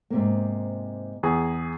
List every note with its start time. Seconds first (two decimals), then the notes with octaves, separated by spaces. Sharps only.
0.10 G#2 C3 A#3
1.23 E2 G#4